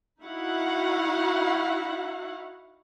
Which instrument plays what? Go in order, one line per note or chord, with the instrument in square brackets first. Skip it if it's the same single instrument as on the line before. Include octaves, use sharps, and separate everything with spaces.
[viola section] D#4 E4 F#4 F5 F#5